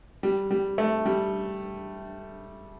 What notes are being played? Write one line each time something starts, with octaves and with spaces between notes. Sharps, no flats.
G3
G3
A3
G3